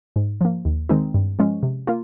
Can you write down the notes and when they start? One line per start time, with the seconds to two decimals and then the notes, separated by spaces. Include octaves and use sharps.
0.16 G#2
0.41 F3 A#3
0.65 D#2
0.89 D#3 G#3 C4 D#4
1.14 G2
1.39 F3 G#3 C#4
1.63 C3
1.87 A#3 F4